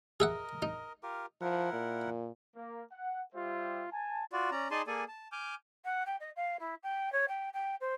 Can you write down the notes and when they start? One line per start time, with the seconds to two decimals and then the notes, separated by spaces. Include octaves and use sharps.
0.20 G#4 A#4 D#5 E5 F#5
0.62 D#4
1.03 F4 G4 A#4
1.41 F3 E4 A#4 F#5
1.73 A#2
2.56 A#3
2.92 F#5
3.34 G3 F4 G4 C5 E5
3.92 G#5 A5
4.33 F4 F#4 D5
4.51 C#4 D5 A#5
4.71 D#4 G#4 D5 G#5 A5 C6
4.87 A#3 G#4 A4 D5 G#5
5.08 A5
5.32 G#5 D6 F6 G6
5.85 F#5
6.06 G5
6.20 D#5
6.36 F5
6.60 E4
6.83 G5
7.12 C#5
7.28 G5
7.53 G5
7.81 C5